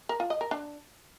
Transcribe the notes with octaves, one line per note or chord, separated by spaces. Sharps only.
A#4
F4
D#5
A#4
D4